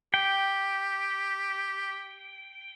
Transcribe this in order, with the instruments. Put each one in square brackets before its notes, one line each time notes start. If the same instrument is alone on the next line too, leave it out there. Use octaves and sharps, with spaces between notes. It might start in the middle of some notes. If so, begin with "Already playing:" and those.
[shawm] G4 [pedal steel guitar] G5